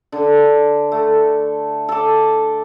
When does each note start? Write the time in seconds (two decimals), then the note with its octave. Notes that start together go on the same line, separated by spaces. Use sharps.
0.12 D3
0.92 A3
1.89 A4 D6